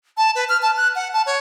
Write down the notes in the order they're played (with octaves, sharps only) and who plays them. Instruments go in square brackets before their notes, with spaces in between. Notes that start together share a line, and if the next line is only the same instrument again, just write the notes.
[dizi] A5
B4
F6
A5
F#6
F#5
A5
C#5